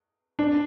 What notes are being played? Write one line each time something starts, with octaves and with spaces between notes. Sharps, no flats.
D4